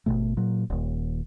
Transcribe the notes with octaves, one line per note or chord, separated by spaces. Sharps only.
G#1 D#2 B2 A3
A#2 F#3
D#1 D#2